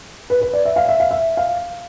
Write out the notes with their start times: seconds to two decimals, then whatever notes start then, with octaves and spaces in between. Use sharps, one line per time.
0.30 B4
0.42 B4
0.53 D5
0.65 E5
0.76 F5
0.89 E5
1.00 F5
1.11 E5
1.37 F5